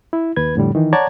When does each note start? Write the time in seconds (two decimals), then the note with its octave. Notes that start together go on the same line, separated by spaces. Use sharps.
0.13 E4
0.36 D#2 B4 G#6
0.55 F2 A2 D3 G3
0.75 D#3 E3 D#4
0.93 C#5 D5 F#5 A5 A#5 G#6